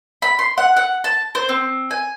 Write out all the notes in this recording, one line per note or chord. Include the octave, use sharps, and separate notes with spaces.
B5
C6
F#5
F#5
A5
C5
C4
G#5